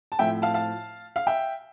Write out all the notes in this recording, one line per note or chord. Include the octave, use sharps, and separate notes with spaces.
A5
A2 F3 A3 C4 E4 E5 G5
F5 A5
F5 A5
F5
E5 G5